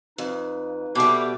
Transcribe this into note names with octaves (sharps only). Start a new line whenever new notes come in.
F2 D#4 B4
B2 G3 A4 E5 D6